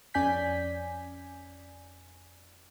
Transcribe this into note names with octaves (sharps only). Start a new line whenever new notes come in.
F2 C#4 D5 G#5 G6 B6